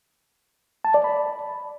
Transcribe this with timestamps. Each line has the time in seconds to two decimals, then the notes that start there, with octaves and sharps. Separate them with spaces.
0.85 A5
0.94 D5
1.04 B5